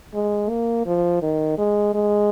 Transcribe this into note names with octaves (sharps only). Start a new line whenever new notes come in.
G#3
A#3
F3
D#3
G#3
G#3